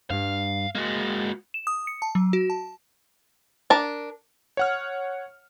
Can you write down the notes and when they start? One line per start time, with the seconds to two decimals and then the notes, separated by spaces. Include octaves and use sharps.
0.10 G2 F5
0.75 G#3 A#3 F#4
1.54 E7
1.67 D#6
1.87 C#7
2.02 A5
2.15 F#3
2.33 F#4
2.50 A5
3.70 D4 A#4 A5
4.57 C#5 F#5 F6